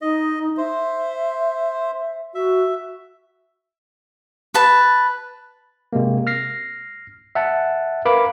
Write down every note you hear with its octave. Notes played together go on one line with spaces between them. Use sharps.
D#4 D#5
C5 E5
F#4 E5
B4 A5
C3 G#3 A#3
F6 A#6 C7
E5 F#5 A5
A#4 B4 F5 B5 D6